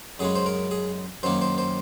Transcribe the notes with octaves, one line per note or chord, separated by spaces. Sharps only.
F#2 C#3 G#3 G#4
C5
A#4
G#4
F#2 D#3 A#3 C5
C5
C5